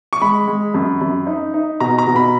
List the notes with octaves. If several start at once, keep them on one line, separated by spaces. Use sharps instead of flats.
C#6
G#3 B5
G#3
F#2
F#2
D#4
D#4
B2 A#5
A#5
B2
B5